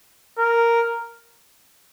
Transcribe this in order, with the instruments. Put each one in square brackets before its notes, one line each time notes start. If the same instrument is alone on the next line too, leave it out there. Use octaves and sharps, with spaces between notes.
[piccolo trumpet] A#4